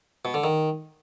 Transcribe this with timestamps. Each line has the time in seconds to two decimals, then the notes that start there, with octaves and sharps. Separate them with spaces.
0.25 B2
0.34 D3
0.44 D#3